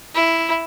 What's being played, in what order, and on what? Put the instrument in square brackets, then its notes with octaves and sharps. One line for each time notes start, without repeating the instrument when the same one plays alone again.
[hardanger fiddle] E4